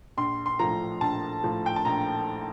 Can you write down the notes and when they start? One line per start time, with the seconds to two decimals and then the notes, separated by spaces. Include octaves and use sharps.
0.17 A#1 C6
0.46 C6
0.59 A2 F3 A#5
1.01 A#1 A5
1.44 A2 F3
1.66 G5
1.76 A5
1.85 A#1 A#5